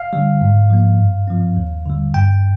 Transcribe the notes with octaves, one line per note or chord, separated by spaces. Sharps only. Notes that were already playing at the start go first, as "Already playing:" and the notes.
Already playing: F5
D3 G3
G#2
F3 A#3
G2
F3 C4
D#2
D3 G3
G2 G5